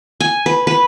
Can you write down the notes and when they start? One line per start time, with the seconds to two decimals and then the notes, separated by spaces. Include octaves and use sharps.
0.20 G#5
0.46 B4
0.67 B4